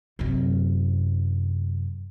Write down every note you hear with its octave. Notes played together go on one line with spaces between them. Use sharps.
F#2 C3